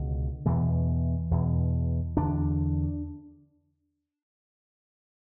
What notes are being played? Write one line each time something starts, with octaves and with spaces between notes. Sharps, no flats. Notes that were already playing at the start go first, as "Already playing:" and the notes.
Already playing: C#2 B2 D3
E2 B2 E3
E2 B2
E2 D3 D4